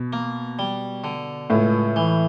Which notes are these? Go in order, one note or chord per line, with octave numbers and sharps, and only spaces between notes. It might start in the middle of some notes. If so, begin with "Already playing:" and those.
Already playing: B2
A#3
G3
D3
C#2 A2
E3